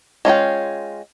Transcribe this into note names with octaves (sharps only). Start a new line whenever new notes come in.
G#3 C#4 F4 G5